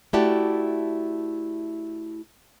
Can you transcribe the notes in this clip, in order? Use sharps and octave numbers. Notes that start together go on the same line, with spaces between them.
A3 E4 F#4 G4 D5 A5